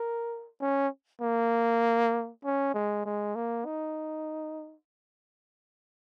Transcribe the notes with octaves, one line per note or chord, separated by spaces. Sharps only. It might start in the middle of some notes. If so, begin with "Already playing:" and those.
Already playing: A#4
C#4
A#3
C#4
G#3
G#3
A#3
D#4